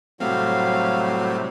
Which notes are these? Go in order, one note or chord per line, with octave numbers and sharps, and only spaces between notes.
A2 C3 F#3 G3 A3 C4 F5